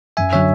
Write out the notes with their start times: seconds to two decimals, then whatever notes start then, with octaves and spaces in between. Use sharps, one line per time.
0.17 F#2 E5 G#5
0.33 D3 F#3 C#5 E5